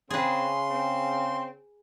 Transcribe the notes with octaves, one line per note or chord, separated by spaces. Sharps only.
C#3 C4 G#4 B4 C6
C4